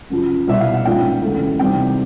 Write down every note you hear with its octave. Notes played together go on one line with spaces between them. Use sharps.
F#2 C#3 F3
C2 B2 G3 B3 E4 E5
F5
F#5
A#1 G#2 F3 A#3 C#4 G5
E1 D2 C#3 E3
E2 C3 D#3 G3 C4 G5